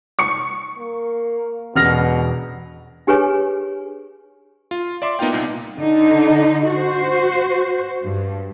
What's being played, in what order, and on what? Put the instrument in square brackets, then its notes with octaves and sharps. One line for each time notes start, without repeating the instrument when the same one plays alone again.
[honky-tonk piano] C#6 C#7
[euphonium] A#3
[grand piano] E1 F6 A#6 [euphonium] B2
[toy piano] D4 G4 G#4 B4 C#5 G#5
[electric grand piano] F4
D5 E5 C6 D6
A#3 B3 D#4 F4 F5 G5
C2 A#2 D#4
[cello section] D3 D#4
F#4 C5
G2